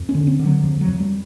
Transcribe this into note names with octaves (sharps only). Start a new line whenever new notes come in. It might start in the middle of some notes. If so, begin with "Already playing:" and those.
Already playing: F2
C#4
D3
C4
D3
F#3
F2 F3
F#3
F2
G3